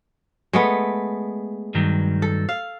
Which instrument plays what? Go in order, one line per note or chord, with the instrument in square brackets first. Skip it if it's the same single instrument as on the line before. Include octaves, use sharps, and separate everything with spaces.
[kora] G#3 A3 B3
[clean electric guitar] G2 D#3 F#3
[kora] A4
F5